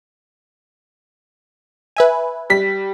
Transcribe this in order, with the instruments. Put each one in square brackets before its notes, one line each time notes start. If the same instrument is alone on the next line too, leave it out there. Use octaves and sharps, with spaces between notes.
[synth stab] B4 E5 G#5
[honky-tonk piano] G3 B6